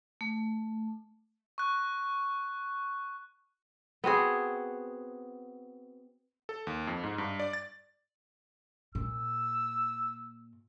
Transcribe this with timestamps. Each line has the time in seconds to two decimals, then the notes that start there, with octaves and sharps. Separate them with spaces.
0.21 A3
1.58 C#6 F#6
4.04 B3 C4 F#4 G#4
6.49 A4
6.67 D#2
6.87 F2
7.03 G#2
7.18 G2
7.39 D5
7.53 A6
8.95 A#2 E6